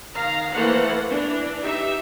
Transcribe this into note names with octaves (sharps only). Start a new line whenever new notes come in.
D#3 F5 A#5
E3 A3 A#3 A4 C5 F#5
E3 D4
D#4 G4 E5